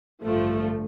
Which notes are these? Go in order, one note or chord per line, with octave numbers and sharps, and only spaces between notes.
A1 G2 D3 F3 A3